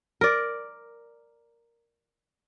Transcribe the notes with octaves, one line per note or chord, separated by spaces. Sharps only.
A#4 D5